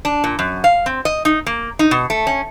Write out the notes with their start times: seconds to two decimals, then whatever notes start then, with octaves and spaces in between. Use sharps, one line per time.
0.05 D4
0.24 A#2
0.39 F#2
0.64 F5
0.86 C4
1.05 D#5
1.25 D#4
1.46 A#3
1.79 D#4
1.91 B2
2.10 A3
2.27 C#4